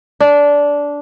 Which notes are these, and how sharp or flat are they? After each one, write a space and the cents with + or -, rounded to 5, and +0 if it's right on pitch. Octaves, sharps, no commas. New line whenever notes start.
D4 -15